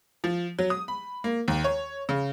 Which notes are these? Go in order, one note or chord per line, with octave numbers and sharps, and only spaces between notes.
F3
F#3
D#6
B5
A#3
D#2
C#5
C#3